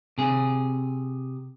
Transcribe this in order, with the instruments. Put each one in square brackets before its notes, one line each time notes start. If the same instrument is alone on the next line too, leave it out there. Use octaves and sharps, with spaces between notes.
[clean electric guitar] C3 G#4